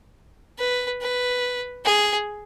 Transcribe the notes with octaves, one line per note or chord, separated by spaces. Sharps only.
B4
B4
G#4